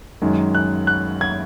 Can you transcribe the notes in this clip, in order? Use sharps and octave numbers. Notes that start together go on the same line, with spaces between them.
F#2 D#3 G#3
F#6
F#6
G#6